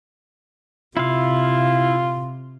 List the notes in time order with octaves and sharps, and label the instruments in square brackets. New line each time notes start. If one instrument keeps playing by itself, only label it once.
[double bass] C3 [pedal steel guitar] E4 F5 [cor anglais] F4